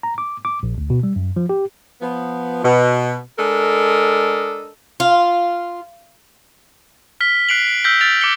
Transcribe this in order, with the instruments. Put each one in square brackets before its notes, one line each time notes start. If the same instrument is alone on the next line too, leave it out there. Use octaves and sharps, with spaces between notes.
[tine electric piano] A#5
D6
D6
A#1
D2
B2
G3
F#2
F3
G4
[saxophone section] F3 B3
B2
G#3 D4 A4 A#4 D#5
[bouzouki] F4
[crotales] F6 B6 G7
F#6 C7 D7 F7 F#7
D7
E6 F6 G6 A#6 B6 G7
F6 G6 A6 D7 F7
D6 C#7 G7